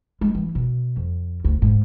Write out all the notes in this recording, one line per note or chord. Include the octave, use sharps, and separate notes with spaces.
G#3
E3
B2
F2
D2
G#2